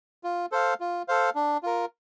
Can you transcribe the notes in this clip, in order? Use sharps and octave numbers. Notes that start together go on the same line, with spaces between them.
F4
A4 C5 F5
F4
A4 C5 F5
D4
F4 A#4